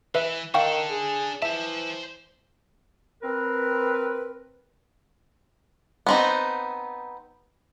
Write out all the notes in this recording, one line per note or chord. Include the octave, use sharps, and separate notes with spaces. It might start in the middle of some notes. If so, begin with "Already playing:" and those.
E3 B4 E5
D#3 D4 A4 F5 G5 C#6
G#4
E3 C5 E5 A5
C4 A#4 B4
B3 C4 D#4